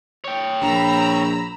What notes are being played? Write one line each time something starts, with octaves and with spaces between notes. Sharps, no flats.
C#5 G5
A#1 A#5 B5 E6